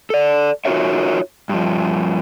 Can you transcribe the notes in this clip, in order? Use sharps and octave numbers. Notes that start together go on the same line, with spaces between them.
A4 D5
D#4 F4 F#4 A#4 C#5 E5
G2 F3